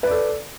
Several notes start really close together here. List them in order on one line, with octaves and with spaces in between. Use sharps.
B4 D5 A4